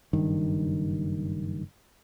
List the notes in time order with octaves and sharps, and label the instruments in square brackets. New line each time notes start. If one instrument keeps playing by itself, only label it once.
[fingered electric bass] F#1 G2 D#3